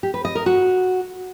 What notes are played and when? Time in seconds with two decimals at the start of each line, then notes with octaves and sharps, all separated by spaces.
0.03 G4
0.14 B4
0.25 D#5
0.35 A#4
0.46 F#4